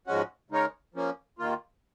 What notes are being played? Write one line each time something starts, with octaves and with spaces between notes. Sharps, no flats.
G#2 F3 G#3 C#4 F#4
C#3 G#3 D#4 A#4 C#5
F3 A#3 C#4
D#2 D#3 A#3 F4